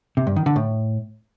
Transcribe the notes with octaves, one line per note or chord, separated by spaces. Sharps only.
C3
G2
D#3
D3
A2